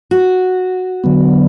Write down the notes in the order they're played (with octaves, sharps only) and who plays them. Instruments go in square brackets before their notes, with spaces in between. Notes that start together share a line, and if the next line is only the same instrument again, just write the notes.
[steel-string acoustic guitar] F#4
[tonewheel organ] D3 F#3 B3